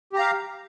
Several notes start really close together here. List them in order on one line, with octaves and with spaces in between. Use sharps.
G4 A#5 F5